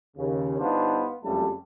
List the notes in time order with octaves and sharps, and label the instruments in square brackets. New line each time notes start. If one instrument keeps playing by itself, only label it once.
[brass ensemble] D#2 C#3
G1 B3 D4 D#4 C5 F5
F#1 F2 C#3 G3 A3 A5